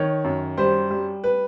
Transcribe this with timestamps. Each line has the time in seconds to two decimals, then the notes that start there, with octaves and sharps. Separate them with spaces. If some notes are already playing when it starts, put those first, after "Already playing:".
Already playing: D#3 C#5
0.24 F#2
0.58 G3 C5
0.91 G3
1.24 B4